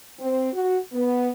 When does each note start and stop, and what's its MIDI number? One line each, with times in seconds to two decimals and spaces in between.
0.19 0.49 60
0.53 0.78 66
0.93 1.30 59